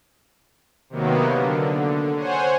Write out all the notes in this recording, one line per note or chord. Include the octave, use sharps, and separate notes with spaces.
C3 D#3 F#3 A#3 B3
D3
C5 C#5 F#5 G#5